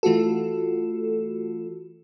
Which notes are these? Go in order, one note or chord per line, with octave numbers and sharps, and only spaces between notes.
E3 A3 F4 F#4 A4